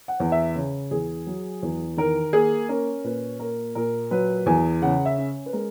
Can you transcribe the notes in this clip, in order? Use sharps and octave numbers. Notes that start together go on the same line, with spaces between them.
F#5
E2
E5
C#3
E2 G#4
F#3
E2
D#3 A#4
A#3 G#4
C#4 A#4
A#2 B4
A#3 A#4
A#2 A#4
F#3 B4
E2 G#5
C#3 F#5
E5
C#4
B4
G#3 A#4